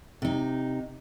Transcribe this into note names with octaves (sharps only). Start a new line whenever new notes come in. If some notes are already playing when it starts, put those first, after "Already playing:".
C3 D#4